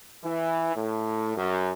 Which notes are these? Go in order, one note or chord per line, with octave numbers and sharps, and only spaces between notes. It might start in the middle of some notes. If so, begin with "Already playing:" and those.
E3
A2
F#2